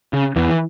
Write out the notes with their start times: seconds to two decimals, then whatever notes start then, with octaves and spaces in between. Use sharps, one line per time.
0.13 C#3
0.36 E2 E3